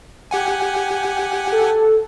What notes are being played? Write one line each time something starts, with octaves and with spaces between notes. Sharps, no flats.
G4 F#5 G#5
A4